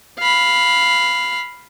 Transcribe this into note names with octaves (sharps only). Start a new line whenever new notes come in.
F5 B5